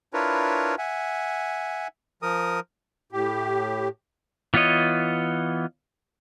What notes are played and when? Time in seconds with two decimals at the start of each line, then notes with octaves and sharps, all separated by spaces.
0.14 D4 E4 F4 A#4 B4 C#5
0.78 E5 F#5 G#5
2.22 F3 A#4 D#6
3.12 A2 G4
4.54 E3 B3 F4 C#5 D#5